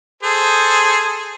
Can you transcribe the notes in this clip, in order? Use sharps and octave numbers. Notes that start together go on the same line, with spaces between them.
G#4 A4 C5